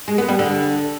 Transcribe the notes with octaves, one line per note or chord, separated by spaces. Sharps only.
G#3
B3
G3
D3